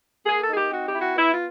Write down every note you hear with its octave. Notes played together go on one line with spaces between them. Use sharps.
A#3 G#4
A4
D#4 G#4
G4
C4 F#4
G4
E4
F#4
B3 E4
F4